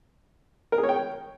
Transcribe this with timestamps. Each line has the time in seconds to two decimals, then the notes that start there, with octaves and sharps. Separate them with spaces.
0.72 A#4
0.78 G#4
0.83 C#5
0.89 G5